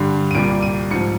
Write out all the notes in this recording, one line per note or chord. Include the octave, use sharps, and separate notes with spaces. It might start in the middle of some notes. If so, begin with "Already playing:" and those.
Already playing: G2 D3 G3 C7
D#7
C2 A#2 G3 D7
D#7
G#2 F3 C#7